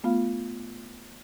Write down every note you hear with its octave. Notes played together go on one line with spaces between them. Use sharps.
A3 B3 F4 F5